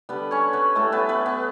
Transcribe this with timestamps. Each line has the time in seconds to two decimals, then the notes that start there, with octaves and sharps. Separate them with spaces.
0.09 D3 G3 B3 B4
0.31 C#4 C#5
0.53 B3 B4
0.75 A2 G3 A3 A4
0.92 B3 B4
1.09 B3 B4
1.26 B3 B4